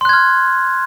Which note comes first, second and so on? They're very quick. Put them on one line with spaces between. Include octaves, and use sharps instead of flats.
C6 F#6 G#6 F6